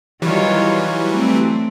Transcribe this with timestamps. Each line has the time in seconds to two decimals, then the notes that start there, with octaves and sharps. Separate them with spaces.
0.22 D#3 E3 F#3 G3 F4 C#5
1.10 A3 C4